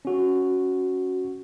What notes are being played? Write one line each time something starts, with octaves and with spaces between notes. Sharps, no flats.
C#4 F#4